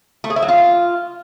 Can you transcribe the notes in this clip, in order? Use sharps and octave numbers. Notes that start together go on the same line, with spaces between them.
A3
G#4
E4
F#3
F4